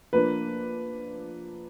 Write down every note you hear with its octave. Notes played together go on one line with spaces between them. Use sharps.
F3 A#3 D4 B4